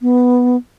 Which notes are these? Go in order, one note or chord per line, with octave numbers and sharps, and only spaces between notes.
B3